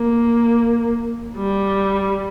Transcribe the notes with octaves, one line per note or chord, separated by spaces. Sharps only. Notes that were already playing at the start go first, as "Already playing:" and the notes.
Already playing: A#3
G3